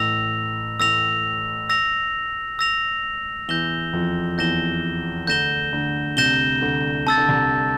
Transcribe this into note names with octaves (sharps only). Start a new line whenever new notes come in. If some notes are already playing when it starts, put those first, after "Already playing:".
Already playing: A1 A2 E6 A#6 F7
A1 A2 E6 A#6 F7
E6 A#6 F7
E6 A#6 F7
E2 E3 G6 A#6 E7 G7
F2 F3
E2 E3 G6 A#6 E7 G7
D2 D3 G6 A#6 E7 G7
D2 D3
C2 C3 G6 A#6 E7 G7
D2 D3
C3 A5 E6 A6
D3
C2 C3